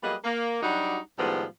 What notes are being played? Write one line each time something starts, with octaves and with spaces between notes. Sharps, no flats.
F#3 G3 A#3 G#4 B4 D#5
A#3
F#3 G3 D4 D#4 F#4 F#5
A2 D#3 F3 G3 G#3 B3